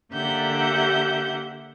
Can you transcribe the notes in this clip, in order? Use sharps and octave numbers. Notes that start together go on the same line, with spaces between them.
D3 A#3 G4 E5 F#5 G6